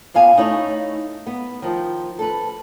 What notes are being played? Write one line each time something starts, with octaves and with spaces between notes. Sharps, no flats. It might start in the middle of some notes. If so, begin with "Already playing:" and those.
A#2 B3 F5 G#5
A3 D#4 E4 C#5
B3
D#3 F3
A4 B4